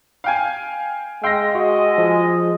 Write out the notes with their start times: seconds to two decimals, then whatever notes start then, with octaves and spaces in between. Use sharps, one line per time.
0.24 F5 G5 G#5
1.24 G#3 F5 G5 C6 E6 A#6
1.55 F#4 D#5
1.98 F3